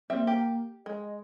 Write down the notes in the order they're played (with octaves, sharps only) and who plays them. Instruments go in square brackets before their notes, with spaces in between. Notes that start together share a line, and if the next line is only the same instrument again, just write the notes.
[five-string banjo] G3 C4 E5 [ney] A#3
[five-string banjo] G4
[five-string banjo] G#3 [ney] D#5